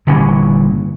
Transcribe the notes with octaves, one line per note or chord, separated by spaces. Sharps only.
G1 A#2 E3 C#4